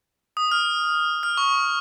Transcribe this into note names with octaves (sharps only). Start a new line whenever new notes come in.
D#6
F6
F6
C#6